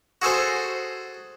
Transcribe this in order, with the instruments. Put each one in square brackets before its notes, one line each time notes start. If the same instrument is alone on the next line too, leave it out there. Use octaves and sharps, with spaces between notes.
[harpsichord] F#4 G#4 A4 C5